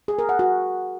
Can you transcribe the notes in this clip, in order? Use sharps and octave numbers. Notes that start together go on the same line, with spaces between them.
G#4
A#4
F#5
F#4